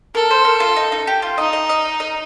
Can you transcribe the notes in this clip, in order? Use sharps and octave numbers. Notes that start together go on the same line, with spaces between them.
A4 A#4
C5
A#4
F4
D#4
D#4
G4
F4
D#4 D#5
D#5
D#5
D#5